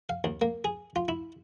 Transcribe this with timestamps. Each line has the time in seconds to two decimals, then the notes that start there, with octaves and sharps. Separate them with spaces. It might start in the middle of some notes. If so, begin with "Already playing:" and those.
0.09 F5
0.24 D#2
0.41 A#3
0.64 G#4
0.96 F4
1.08 E4